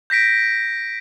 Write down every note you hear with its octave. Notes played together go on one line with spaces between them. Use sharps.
G6 A#6 B6 D7